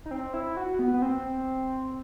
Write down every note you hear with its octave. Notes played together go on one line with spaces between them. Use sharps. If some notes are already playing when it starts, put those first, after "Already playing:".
D#4
C4
E4
F#4
B3
B3
C4